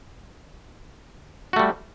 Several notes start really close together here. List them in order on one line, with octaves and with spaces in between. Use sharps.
F#4 A3 G3